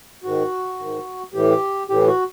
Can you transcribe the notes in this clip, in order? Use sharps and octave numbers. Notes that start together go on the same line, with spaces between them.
G#2 D#3 F#4
G#2 D#3
A2 E3 G4
A2 E3 G4
F#4